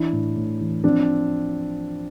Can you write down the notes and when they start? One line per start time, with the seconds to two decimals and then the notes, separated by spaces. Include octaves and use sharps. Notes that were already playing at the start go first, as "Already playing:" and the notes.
Already playing: E3 D4 E4
0.12 A2
0.37 A2
0.61 E3
0.84 F3 C4 D4